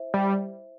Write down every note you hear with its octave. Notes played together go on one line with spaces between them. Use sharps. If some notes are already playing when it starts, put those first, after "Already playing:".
Already playing: E4 C5 E5
G3